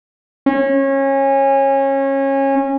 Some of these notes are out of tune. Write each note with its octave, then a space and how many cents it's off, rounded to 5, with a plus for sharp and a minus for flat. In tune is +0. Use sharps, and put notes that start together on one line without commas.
C#4 -25